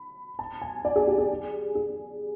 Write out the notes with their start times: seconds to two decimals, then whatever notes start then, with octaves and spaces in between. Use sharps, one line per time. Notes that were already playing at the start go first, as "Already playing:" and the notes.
Already playing: B5
0.39 A5
0.62 G#5
0.85 D5
0.96 G#4
1.07 G4
1.18 G#4
1.75 G#4